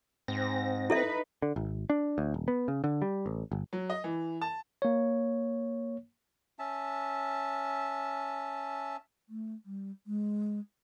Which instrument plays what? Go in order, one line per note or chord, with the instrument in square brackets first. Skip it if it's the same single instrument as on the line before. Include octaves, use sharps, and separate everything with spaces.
[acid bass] G#2 [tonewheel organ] C4 A#6
[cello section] D#4 B4 [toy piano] E4 A4 E5
[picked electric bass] D3
G#1
D4
D2
D#1
B3
C#3
D3
G3
A1
G1
[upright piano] F#3
D#5
E3
A5
[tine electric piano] A#3 C#5
[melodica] C#4 E5 A5
[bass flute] A3
G3
G#3